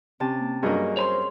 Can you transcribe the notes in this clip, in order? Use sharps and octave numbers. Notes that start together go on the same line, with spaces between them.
C3 C#4 A5
A#3
G2 F#3 A#3 G#4 D#5 C#6
C5 C#5 B5 C6